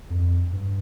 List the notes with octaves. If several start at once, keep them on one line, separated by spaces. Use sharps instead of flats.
F2
G2